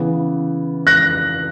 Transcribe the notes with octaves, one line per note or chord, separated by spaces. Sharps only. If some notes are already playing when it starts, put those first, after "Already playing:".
Already playing: C#3 E3 B3
F#6 A#6